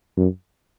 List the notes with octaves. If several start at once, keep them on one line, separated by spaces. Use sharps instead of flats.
F#2